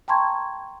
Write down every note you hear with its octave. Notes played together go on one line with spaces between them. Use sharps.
G5 A5 A#5 C6 C#6 G#6